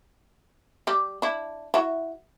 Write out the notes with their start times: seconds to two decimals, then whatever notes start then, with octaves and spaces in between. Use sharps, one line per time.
0.87 G3 G4
1.22 D4 E4
1.74 E4 F#4 E5